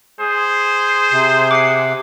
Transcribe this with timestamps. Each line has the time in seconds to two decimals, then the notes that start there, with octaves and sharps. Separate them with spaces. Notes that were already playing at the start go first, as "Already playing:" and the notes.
0.20 G#4 C5
1.12 C3
1.51 F#5 D6 C7